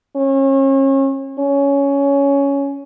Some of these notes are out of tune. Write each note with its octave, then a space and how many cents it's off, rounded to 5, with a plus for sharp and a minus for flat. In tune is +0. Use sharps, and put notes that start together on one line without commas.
C#4 -35
C#4 +10